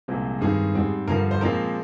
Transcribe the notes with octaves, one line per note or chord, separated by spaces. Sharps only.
C2 A#2 F3 G#3 C4
G2 D#3 G#3 C4 G#4
G#2 G3 C4
G2 D3 F3 A#4
C5
A#2 F3 G#3 C4 A#4